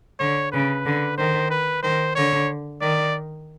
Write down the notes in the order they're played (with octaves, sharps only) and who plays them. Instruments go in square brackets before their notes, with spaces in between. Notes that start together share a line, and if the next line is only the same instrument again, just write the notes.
[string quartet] D3 [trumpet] C#5
[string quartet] C#3 [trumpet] B4
[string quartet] D3
[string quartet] D#3 [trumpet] C5
[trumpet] B4
[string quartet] D#3 [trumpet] C5
[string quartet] D3 [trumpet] C#5
[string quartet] D#3 [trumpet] D5